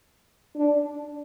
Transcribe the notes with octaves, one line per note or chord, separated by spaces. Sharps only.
D4